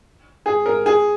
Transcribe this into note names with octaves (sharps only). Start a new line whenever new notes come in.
G#4
A#4
G#4